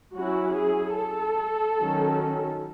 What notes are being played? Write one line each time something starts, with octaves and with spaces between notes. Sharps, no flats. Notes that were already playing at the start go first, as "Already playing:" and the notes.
F#3 C#4 E4 F#4
G#4
A4
D#3 F#3 C#4